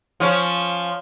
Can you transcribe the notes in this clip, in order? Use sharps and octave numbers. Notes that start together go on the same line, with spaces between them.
F3 C#4